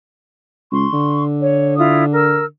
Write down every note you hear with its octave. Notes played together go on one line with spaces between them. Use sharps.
C#2 C6 C#6
D3
C#5
E4 F4 D#6
A#4 E6 F6